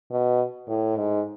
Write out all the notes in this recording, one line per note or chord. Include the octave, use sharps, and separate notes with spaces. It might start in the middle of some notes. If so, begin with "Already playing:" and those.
B2
A2
G#2